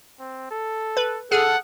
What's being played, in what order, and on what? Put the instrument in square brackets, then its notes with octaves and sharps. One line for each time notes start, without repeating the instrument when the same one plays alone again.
[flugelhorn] C4
A4
[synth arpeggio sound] B4
[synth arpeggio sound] G#4 F6 [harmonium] A4 [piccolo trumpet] F#5